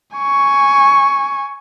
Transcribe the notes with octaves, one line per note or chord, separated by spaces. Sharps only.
G#5 C#6